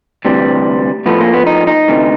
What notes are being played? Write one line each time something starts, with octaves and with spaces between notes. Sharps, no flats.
D2 C3 E3 G3
A2 F3 A3 B3
A#3
B3
D#4
D#4
D2 C3 E3 A3